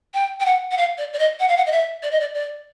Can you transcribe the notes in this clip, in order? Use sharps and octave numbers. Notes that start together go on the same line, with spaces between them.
G5
G5
F#5
F#5
F5
D5
D5
D#5
F#5
F5
F#5
D#5
E5
D5
D#5
D5
D5